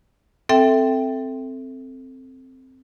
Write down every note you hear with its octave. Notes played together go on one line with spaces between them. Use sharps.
C4 A4 E5 G5